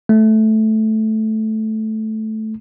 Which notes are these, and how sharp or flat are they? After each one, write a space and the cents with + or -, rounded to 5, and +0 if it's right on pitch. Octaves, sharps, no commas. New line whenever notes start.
A3 -10